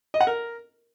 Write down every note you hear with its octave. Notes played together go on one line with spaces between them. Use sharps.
D#5
F#5
A#4